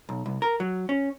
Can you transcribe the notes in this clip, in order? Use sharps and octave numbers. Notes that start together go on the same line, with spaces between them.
B1
C2
A#4
F#3
C#4